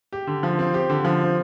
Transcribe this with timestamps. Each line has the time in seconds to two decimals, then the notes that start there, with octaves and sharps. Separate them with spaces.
0.13 G4
0.27 D3
0.43 F3
0.59 C4
0.74 G4
0.90 D3
1.05 F3
1.21 C4